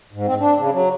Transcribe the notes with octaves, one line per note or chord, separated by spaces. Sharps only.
G#2
C4
D4
C#3
F#3